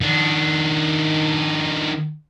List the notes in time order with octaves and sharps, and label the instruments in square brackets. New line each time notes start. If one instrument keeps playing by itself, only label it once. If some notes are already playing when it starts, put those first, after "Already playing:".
[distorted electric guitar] D#3 D4